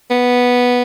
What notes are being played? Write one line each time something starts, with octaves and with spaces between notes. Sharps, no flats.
B3